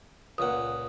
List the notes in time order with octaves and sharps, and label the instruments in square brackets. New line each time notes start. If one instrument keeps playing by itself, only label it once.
[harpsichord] C#2 A#2 F#5 [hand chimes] D#6